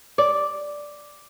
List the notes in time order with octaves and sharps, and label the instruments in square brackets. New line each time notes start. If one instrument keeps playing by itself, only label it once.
[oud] D5